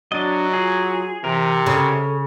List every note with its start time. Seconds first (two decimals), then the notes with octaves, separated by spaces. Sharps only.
0.12 F#3 D4 D#5
0.53 F4 G#4
1.24 C3 E3 A#4
1.66 C#3 A4